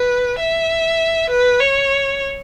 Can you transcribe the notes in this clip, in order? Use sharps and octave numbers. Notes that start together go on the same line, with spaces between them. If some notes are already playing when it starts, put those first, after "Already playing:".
Already playing: B4
E5
B4
C#5